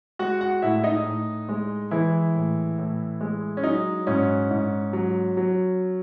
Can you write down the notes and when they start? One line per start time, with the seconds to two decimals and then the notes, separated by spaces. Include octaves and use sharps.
0.19 G#3 F#4 F#5
0.41 F#4 F#5
0.62 A2 E4 E5
0.84 D#4 D#5
1.06 A2
1.49 G#3
1.91 E3 G#3 E4
2.35 A2
2.78 A2
3.21 G#3
3.57 C#4
3.64 F#3 D#4
4.07 G#2 C#4
4.51 G#2
4.93 F#3
5.37 F#3